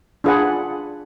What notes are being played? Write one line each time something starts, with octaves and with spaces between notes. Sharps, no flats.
D4 F4 G#4 B4 F#5